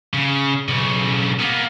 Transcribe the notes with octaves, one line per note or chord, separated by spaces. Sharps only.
C#3
B1 C#3
A#3 B3